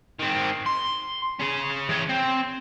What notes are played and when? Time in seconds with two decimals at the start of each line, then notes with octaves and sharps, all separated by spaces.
0.20 D#3 C4
0.66 C6
1.40 C#4 G#4
1.89 E3 C#5
2.09 C4